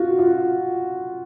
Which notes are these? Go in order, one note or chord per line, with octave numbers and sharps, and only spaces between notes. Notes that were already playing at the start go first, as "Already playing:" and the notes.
Already playing: F4 F#4
F4